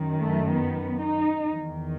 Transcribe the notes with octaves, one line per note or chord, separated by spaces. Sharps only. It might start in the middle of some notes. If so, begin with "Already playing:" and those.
Already playing: F#2 D#3
A3
B3
D#4
E2 D#3